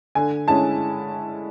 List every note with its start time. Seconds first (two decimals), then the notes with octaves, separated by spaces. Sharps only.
0.15 D3 G#5
0.48 G#3 C#4 E4 A5